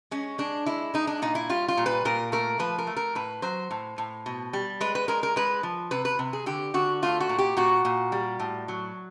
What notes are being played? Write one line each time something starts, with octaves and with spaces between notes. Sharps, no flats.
G#3 C#4
G#3 D4
G#3 E4
G#3 D#4
D4
A#2 D#4
E4
G3 F4
F4
A#2
B4
A#2 A#4
A3 A#4
F3 B4
A#4
A3
A#4
A2 B4
F#3 C5
A2
A2
B2
G3
G#3 B4
B4
G#3 A#4
A#4
G#3 B4
F3
C3 B4
B4
C3
G#4
D3 G4
D3 F#4
A3 F4
F#4
A#2
G4
A#2 F#4
A#2
G3
A2
F#3